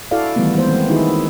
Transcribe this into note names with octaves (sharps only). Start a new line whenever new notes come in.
E4 F#4 A4 D5 F5
D#3 E3 G3 A3 B3
E3 G#3 B3 C5
E3 A3 C4
D#3 D#4 E4 F#4 G#4